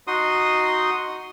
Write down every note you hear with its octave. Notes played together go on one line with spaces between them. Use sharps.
D#4 F#4 C6 D#6